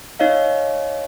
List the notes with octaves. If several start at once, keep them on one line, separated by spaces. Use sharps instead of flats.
D#4 C#5 D#5 F5